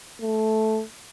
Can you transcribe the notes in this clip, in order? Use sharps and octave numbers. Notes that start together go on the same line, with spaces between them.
A3